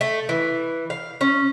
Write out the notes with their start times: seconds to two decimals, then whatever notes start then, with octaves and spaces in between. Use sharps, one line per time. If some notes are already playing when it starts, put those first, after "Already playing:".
0.01 A3
0.29 E3
0.90 F5
1.21 C#4